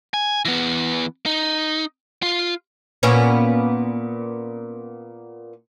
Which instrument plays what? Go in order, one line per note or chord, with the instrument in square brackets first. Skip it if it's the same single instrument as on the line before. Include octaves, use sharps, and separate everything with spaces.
[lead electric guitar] G#5
E3 B3
D#4
F4
[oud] A#2 B3 C#4